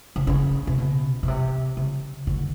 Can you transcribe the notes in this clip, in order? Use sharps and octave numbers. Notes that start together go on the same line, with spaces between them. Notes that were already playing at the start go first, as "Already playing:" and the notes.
C#3
C#3
C3
B2
B2
C3
C#3
D3